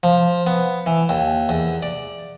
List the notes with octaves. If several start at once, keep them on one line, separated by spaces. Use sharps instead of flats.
F3
B3
E3
D#2
E2
D5